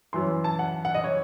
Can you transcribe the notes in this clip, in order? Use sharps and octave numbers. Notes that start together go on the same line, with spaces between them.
F#2 E3 C6
A5
F#5
F#5
D#5
C#5